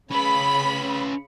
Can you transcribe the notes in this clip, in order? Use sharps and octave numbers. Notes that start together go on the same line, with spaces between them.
C#3 C#4 B4 B5